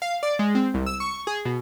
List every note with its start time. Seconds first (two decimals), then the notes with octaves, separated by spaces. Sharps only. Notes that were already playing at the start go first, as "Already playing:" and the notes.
0.02 F5
0.23 D5
0.39 G#3
0.55 C4
0.74 C2
0.86 E6
1.00 C#6
1.27 G#4
1.45 B2